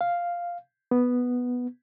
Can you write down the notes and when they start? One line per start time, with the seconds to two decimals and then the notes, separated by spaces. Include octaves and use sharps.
0.01 F5
0.91 B3